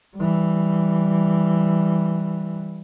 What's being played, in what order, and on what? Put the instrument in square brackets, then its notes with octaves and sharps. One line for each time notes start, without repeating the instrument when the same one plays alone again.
[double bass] E3 G3